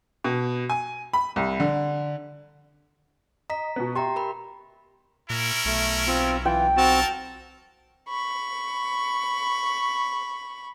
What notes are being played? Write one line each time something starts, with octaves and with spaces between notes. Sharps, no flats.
B2
G#5
B5
C2
D3
D#5 A#5 B6
B2 B3
G4 E5 G5 A#5 C6
A#4 B5
A#2 C#4 E4 A#4
B1 A3
C4 F4
E3 F4 G5
C4 F#4 A4 A#4 A5
B5 C#6